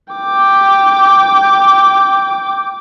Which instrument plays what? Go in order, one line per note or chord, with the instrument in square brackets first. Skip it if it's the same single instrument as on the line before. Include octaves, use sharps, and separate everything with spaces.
[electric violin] G5 D6